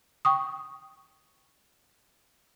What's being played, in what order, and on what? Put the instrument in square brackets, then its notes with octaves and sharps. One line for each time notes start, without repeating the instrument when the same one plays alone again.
[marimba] G5 C#6 D#6